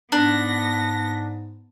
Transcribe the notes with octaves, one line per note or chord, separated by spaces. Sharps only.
G#2 B3 D4 A#6